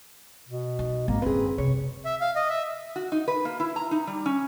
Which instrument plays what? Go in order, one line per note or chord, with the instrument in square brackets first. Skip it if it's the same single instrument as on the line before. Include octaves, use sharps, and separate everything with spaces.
[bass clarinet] B2
[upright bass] D#4
[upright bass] G#1 [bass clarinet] A#3
[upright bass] F#2 D3 [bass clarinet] C4 [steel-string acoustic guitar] G#4 B4
[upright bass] C3 [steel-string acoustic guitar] C#5
[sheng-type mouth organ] E5
F5
D#5
E5
[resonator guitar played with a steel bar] F#4
D#4
B4
A#3
E4
A#5
D#4
G3
C#4